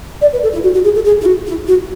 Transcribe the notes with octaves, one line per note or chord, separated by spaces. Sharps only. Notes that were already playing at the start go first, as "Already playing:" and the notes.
D5
B4
A4
E4
F#4
F#4
G#4
A4
G#4
E4
F#4
E4
F#4